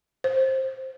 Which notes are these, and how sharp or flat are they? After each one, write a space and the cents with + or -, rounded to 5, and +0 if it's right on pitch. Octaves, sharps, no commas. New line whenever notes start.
C5 +15